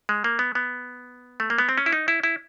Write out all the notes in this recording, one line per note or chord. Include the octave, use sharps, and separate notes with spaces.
G#3
A#3
B3
B3
A3
A#3
B3
C4
C#4
E4
D#4
E4
E4